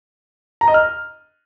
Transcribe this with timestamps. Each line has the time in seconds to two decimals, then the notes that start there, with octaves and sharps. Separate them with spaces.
0.61 A#5
0.68 D#5
0.74 F6